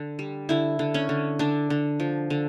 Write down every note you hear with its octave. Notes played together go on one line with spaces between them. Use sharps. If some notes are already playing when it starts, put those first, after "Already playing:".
Already playing: D3
G3
D3 E4
D3
C#4
D3
D3 D4
D3
F3
D3